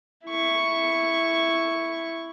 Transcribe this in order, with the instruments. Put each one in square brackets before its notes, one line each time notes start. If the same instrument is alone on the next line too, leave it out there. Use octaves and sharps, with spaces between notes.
[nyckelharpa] E4 C#6